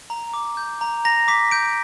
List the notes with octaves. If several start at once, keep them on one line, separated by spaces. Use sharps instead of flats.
A#5
D6
G6
A#5
A#5 A#6
D6 B6
G6 D7